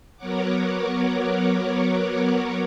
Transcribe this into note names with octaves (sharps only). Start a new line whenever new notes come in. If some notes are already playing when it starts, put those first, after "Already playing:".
F#3 B3 A#4 C#5 F#5 D6